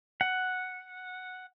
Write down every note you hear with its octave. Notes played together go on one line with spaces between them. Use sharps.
F#5